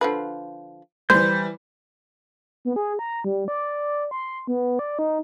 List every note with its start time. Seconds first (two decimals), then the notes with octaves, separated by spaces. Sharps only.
0.01 D3 F3 B4
1.10 E3 G3 C5 G6
2.65 B3
2.76 G#4
2.99 A#5
3.24 G3
3.48 D5
4.11 C6
4.47 B3
4.79 D5
4.99 D#4